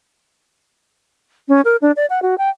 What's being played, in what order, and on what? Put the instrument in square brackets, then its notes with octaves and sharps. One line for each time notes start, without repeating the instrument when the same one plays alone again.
[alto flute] C#4
A#4
D4
D5
F#5
F#4
G5